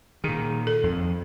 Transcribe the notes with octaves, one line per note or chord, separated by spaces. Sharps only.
A#2 D#3 G#4
A4
F2